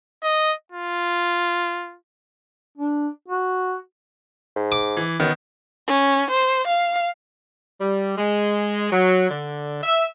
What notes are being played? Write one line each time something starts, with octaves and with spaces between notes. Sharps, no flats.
D#5
F4
D4
F#4
G#2
D6
E3
F#2 D#3 B3
C#4
C5
F5
G3
G#3
F#3
D3
E5